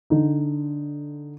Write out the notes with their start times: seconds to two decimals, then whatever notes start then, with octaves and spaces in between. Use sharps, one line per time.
0.10 D3 D#4